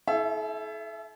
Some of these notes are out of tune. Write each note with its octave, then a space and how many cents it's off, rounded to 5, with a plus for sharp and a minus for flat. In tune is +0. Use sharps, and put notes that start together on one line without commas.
E4 -25 A4 -45 E5 +20